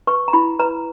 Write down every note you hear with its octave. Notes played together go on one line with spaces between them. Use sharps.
B4 C#6
A#5
E4 B5
B4 A#5